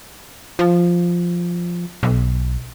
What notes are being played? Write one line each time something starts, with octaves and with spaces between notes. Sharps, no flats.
F3
B1